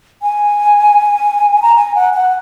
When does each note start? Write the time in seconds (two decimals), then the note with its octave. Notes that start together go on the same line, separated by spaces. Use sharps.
0.22 G#5
1.62 A#5
1.76 G#5
1.95 F#5
2.14 F#5